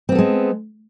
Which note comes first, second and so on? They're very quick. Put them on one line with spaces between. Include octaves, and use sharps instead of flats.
C4 B3 A4 G#3